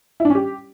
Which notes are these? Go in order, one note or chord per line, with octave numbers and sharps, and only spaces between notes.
E4
D4
C#4
G4